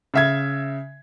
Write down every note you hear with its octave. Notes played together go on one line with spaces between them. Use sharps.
C#3 E5 G#6